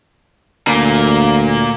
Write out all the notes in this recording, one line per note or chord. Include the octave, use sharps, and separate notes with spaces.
D2 A#2 A#3